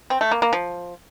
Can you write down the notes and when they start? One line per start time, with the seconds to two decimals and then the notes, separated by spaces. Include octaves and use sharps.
0.10 C4
0.21 A3
0.31 A#3
0.42 A#3
0.53 F3